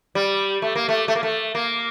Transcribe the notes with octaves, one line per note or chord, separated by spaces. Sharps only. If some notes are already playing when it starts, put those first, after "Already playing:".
G3
A3
A#3
A3
A3
A#3
A3
A#3